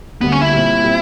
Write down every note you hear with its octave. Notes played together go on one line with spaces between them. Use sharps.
D2 D3 G3 A#3 B3
C#4
E4
A#2 G3 C4
A#2 G3 C4